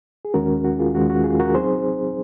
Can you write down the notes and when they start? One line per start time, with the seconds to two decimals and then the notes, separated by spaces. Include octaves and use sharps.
0.25 G#4
0.34 D#2 D#3 G#3 C#4 F#4 A#4
0.64 F#4
0.79 F4 G#4
0.94 D#2 D#3 G#3 C#4 F#4
1.09 F#4
1.24 F4 G#4
1.39 F#4 A#4
1.54 F#3 C4 D#4 G#4 C5